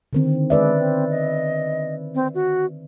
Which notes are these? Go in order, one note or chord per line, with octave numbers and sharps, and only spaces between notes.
D3 D#3 C4
G#3 B4 D5 E5
C4
D#5
C4
F#4